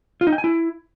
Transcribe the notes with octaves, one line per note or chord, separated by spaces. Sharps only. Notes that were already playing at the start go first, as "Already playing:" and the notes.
F4
D#4
G5
G#5
E4